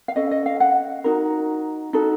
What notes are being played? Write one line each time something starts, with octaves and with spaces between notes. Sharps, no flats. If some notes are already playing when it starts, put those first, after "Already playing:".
F5
C#4 A4 D#5
D#5
F5
F#5
D#4 F#4 A#4
D#4 F#4 A4